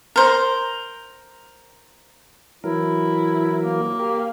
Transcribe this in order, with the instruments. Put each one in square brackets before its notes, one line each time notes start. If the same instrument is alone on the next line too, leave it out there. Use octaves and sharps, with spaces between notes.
[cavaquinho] A#4 C5
[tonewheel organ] E3 F#3 A#4 [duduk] E4
[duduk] A#3
[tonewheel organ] G4 A#4